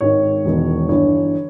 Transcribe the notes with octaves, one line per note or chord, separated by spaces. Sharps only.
G#1 G#2 D#3 C#5
E1 E2 D#3
G1 G2 E3 C#5